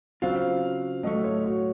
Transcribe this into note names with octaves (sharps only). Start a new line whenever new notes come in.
C#3 F#3 C4 F4 F5
A2 F#3 A3 D#5
C#5
F#4